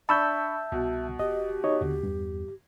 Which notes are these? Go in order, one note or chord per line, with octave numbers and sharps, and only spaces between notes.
D4 E5 A5 B5 C#6 E6 G6
C2 B2
E1 G4 D#5
D#4 C#5 D#5
D#2 D3
E2 G2